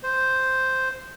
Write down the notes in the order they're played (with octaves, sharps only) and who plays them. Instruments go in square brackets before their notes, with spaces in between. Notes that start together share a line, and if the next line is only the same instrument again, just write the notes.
[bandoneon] C5